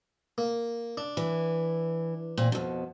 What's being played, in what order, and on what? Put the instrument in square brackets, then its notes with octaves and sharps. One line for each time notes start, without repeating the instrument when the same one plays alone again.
[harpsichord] A#3
D4
[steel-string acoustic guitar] E3
A#2 C4
F2 B2